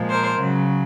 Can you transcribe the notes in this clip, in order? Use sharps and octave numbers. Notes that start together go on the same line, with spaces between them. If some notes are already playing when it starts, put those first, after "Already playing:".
Already playing: A#2 F3 G#3
A#4 C5
C#3 F#3